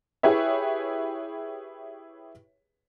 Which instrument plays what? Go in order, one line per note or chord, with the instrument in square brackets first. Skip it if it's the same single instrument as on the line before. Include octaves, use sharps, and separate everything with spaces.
[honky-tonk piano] E4 G4 G#4 B4 C#5 E5